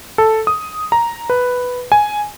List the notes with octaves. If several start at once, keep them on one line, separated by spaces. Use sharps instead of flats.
A4
D#6
A#5
B4
G#5